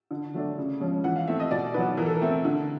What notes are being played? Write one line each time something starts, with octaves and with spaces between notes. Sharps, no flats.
D3
F#3 A3 D4
C#3
F3 G#3 C#4
E3 F#5
F5
A3 C4 E4 E5
D#5
B2 D5
F#3 B3 D#4 B4
E3 A#4
A4
A#4
A3 C4 E4
D3